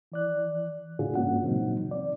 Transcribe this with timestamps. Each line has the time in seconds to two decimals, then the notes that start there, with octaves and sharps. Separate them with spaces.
0.12 E3 D5 F#6
0.99 A2 C#3 D4 F4 F#4 G#4
1.15 G2 G#3 A#3 C#4 F#4 F#5
1.44 A#2 C#3 E3 F#3 C4 D#4
1.91 D5